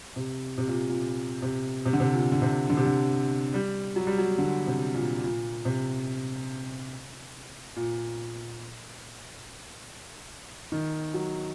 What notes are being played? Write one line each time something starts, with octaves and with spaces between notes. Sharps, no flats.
C3
C3
A#2
A#2
C3
C3
D3
C3
A#2
D3
C3
D3
C3
D3
G3
F#3
G3
F#3
D3
C3
A#2
A#2
C3
A#2
D#3
F#3